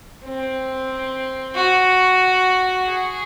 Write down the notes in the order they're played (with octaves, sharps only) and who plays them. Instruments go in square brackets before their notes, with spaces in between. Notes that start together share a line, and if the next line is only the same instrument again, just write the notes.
[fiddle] C4
F#4
G#4